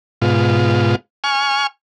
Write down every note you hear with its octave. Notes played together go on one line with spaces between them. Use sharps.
G#2 B2 F4
G#5 C#6 F6